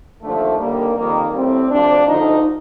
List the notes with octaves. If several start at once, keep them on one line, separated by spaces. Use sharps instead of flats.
D#2 D3 F3 A3
D#2 D3 G3 A#3
F2 D#3 G3 A#3
A2 G3 C4
D2 C3 F3 D4
D2 D3 F3 D#4